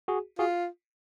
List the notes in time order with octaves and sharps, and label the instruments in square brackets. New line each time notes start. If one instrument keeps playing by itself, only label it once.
[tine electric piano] F#4 G#4
[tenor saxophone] F4 [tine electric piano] F#4 G#4